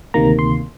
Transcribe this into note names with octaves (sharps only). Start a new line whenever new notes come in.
D2 C3 D#3 A#3 A#5
C6